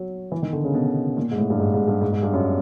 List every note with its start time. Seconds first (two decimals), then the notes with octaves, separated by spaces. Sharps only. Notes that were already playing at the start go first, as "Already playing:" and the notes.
Already playing: F#3
0.32 E3
0.42 D#3
0.53 D3
0.64 C#3
0.74 B2
1.17 A#2
1.31 G#2
1.38 A2
1.50 G2
1.60 G#2
1.74 G#2
1.88 G2
2.01 G#2
2.12 G#2
2.23 G2
2.33 F#2